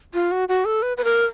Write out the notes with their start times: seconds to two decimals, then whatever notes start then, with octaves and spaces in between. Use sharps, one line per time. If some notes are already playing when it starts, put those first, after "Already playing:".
0.14 F4
0.32 F#4
0.49 F#4
0.65 A4
0.82 B4
0.97 B4
1.04 A#4